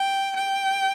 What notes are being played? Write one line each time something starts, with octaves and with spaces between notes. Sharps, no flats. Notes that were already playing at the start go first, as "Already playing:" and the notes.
Already playing: G5
G5